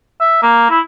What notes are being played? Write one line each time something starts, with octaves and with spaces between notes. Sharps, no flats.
E5
A#3
E4